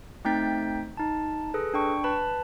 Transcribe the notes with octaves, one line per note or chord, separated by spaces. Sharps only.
A3 C4 D#4 G5 G6 B6
D#4 A5
G#4 A4 B4
D4 G5 C#6
B4 A5 B5